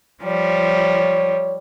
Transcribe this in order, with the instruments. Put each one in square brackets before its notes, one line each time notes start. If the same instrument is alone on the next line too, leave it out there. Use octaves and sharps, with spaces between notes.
[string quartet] F3 G3 [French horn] C#5